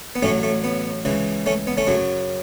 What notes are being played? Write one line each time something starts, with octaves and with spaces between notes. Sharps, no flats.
B3
A1 A2 F#3 A3 C#4
A3
B3
C#2 C#3 E3
A3 C#4
B3
A3 C#4
F#2 C#3 F#3